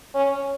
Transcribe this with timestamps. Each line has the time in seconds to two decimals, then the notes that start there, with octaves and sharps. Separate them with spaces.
0.15 C#4